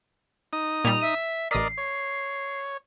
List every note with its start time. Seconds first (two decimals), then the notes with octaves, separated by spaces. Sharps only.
0.53 D#4 D#6
0.85 A#2 G3 F7
1.01 E5 D#7
1.51 A1 A#4 D5 D#5 D#6 B6 C7
1.78 C#5